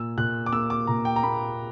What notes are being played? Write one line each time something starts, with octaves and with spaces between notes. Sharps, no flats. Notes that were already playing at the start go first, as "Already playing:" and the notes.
Already playing: A#2 E6
A#2 F#6
D6
A#3 E6
D6
A#2 A#5
G5
A#5
A#3 B5